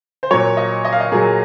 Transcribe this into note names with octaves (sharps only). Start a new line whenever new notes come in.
C5
A#2 F#3 C#5
D#5
D#5
F5
D#5
A#2 F#3 G#4